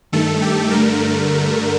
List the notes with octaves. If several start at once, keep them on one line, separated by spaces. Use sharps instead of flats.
G2 D#3 A3 A4
G4
G2 D3 A3 A#4